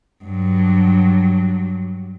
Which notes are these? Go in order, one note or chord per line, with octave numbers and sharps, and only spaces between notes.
G2 F#3